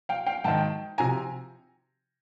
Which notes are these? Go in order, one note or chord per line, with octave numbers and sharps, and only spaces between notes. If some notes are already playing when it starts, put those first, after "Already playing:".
F5 G5
F5 G5
G#2 D#3 G5 A5
C3 F3 G#5 A#5